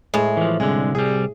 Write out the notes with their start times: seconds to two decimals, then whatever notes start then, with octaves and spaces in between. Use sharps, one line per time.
0.14 A2 G#3
0.37 E3 F3
0.60 C2 D3 G#3
0.95 C2 G3 G#4